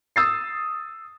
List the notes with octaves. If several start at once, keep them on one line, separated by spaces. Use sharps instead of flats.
D#6 E6 A6 C7